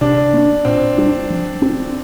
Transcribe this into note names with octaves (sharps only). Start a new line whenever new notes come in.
C3 D4
A#3 D4
A#2 C4
G3 D4
F3
C4